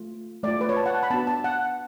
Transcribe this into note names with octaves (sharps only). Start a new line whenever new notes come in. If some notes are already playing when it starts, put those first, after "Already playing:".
Already playing: A3 F4
A3 F4 D5
B4
C#5
A5
F#5
A5
B5
B3 D4 F#4 A5
A5
F#5